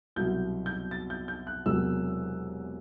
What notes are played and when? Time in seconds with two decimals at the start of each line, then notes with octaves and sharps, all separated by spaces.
0.16 C2 B2 F#3 G6
0.66 G6
0.91 A6
1.10 G6
1.28 G6
1.47 F#6
1.66 E1 E2 C3 F#3 E6